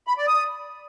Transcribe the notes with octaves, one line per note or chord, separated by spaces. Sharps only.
B5
D5
D#6